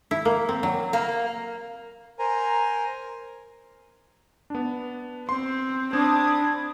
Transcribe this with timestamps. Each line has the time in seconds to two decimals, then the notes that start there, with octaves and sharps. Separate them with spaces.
0.11 E4
0.25 A#3
0.49 C4
0.63 F#3
0.93 A#3
2.19 A#4 C5 G#5 A#5
4.50 B3 D4
5.29 C4 C6
5.93 C4 D4 B5 D#6 G#6